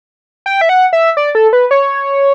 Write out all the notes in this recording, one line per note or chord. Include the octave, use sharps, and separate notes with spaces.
G5
E5
F#5
E5
D5
A4
B4
C#5